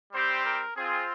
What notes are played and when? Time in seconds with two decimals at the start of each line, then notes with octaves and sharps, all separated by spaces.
0.12 G3 C4 G4 C5
0.44 A#4
0.76 C4 F4 G#4